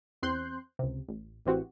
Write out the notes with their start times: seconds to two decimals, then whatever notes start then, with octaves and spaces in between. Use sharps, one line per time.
0.23 E2 C4 C6 F#6 G6
0.79 C#2 C3
1.09 A1
1.46 A1 E3 C4 F#4 G4